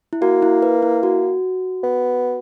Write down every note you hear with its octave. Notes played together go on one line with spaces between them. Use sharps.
E4
A#3 F#4
E4
B4
E4
F#4
B3